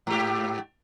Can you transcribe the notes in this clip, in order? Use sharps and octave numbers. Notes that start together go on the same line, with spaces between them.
G#2 G4